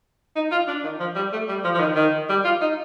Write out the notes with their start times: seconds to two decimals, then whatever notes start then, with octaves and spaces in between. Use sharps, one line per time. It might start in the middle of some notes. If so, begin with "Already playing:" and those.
0.36 D#4
0.51 F4
0.68 D4
0.84 D#3
1.00 F3
1.16 G3
1.33 A3
1.48 G3
1.64 F3
1.74 F3
1.80 D#3
1.96 D#3
2.29 G3
2.45 F4
2.61 D#4